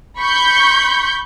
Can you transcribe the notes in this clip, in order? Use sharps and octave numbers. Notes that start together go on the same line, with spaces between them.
B5 C#6 G6